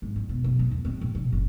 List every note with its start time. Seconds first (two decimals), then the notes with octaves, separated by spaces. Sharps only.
0.02 G#1
0.16 A1
0.29 B2
0.44 B1
0.59 A#2
0.71 E2
0.85 C4
1.01 A#2
1.15 C3
1.32 F#1